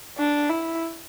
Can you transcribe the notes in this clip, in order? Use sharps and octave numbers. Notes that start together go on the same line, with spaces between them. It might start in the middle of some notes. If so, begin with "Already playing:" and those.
D4
E4